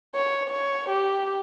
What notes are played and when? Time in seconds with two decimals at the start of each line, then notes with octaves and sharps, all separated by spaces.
0.15 C#5
0.50 C#5
0.89 G4